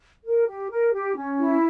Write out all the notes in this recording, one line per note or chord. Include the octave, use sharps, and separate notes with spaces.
A#4
G4
A#4
G4
C#4
E4